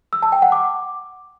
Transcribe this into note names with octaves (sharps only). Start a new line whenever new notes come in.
E6
A5
G5
F#5
D6